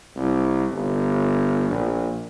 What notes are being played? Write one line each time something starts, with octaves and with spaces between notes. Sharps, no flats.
C2
G1
A#1